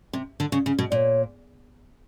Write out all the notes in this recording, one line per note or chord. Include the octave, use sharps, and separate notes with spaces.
C3
D3
C#3
C#3
B2
A#2 C#5 D5